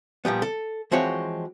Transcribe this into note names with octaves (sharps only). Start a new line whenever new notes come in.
A#2 F3 G3 B3
A4
E3 F3 G#3 C4 F#4 C#5